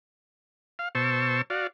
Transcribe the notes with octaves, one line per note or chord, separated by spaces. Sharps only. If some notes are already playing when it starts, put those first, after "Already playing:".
F5
B2 C5 A5 C#6 E6
F#4 D5 F5